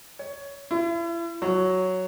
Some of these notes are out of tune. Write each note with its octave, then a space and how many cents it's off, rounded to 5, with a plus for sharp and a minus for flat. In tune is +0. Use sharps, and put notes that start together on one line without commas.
C#5 +15
E4 +40
F#3 +0